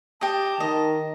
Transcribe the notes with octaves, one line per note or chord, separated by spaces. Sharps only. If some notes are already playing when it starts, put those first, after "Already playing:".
G4 D#5 A5
D#3 D#5